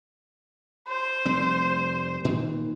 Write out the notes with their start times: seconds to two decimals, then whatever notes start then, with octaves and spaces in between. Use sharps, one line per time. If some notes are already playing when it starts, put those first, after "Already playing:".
0.89 C5
1.26 F1 G3 C4
2.24 A#2 D#3 E3